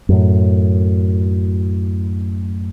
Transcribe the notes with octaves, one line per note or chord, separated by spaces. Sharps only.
F#2 A2